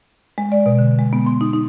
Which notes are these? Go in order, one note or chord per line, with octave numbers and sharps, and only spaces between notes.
G#3
D5
B2
D3
G#3
B3
C6
D#4
D#4